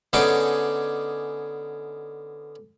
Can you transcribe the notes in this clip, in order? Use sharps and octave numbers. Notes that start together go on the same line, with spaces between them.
D3 B3 C#4 D#4 G#4 D6